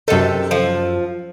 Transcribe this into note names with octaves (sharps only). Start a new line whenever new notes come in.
F#2 C3 D#3 A4
F3